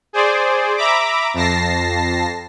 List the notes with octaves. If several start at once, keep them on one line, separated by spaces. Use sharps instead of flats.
G#4 C5 D5
E5 A#5 B5 D6
F2 A5 A#6 C7